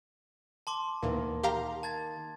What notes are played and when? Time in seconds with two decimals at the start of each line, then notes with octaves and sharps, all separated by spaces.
0.67 A5 C6 D6
1.02 D2 A#2 D#3 E3 A#3
1.43 G4 F5 A#5
1.83 A5 G#6 A6